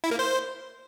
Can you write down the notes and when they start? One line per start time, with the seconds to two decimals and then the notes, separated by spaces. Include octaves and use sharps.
0.04 E4
0.11 A#3
0.19 C5